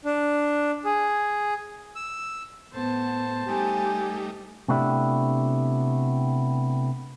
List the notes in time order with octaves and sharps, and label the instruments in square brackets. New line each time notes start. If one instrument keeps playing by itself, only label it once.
[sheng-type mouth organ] D4
G#4
E6
[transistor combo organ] A2 [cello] B3 [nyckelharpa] C5 A5
[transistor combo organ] G3 A3 D#4 [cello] G4 [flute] G#5
[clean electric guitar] C3 A3 B3 D4 E4 G4